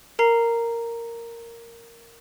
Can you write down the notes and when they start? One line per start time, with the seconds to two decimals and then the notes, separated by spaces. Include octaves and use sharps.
0.19 A#4 A#5 C7